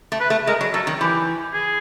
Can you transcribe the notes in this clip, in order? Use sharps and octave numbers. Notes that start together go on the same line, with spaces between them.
A3
B4
A3
G#3 A#4
F#3
F#3 A4
D#3
E3 G4
G#4